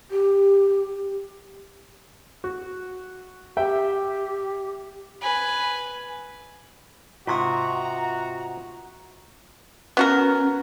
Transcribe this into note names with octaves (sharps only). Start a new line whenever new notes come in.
G4
F#4
G4 E5 G5
B4 G#5
G#2 C3 F4 F#4 A#5 C#6 D#6
B3 C#4 F#4 A#4